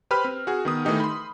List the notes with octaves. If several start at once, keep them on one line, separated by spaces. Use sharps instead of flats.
G4 B4 C5 B5 F6
C4
F#4 G#4
D#3 B3 D#6
D#3 E3 A3 D#4 G4
B5 C6